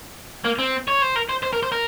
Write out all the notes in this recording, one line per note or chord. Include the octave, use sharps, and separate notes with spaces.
A#3
C4
C#5
C5
A#4
C5
C5
A#4
C5
A#4